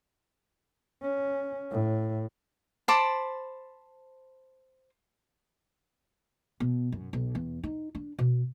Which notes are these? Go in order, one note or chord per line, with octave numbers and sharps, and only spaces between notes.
C#4
A2
C5 A5 B5 D6
B2
F#2
B1
E2
D#4
D4
B2